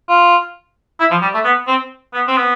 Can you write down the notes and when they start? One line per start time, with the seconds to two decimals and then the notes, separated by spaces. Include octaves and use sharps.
0.09 F4
1.00 E4
1.11 F3
1.22 G3
1.34 A3
1.45 B3
1.67 C4
2.13 B3
2.28 C4
2.37 B3